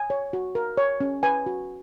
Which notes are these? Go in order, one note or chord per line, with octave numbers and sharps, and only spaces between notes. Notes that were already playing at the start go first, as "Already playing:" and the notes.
Already playing: G#5
C#5
F#4
A#4
C#5
C#4
B4 G#5
F#4